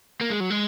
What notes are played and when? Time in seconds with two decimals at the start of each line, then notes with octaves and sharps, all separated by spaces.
0.21 A#3
0.31 G#3
0.40 F#3
0.50 G#3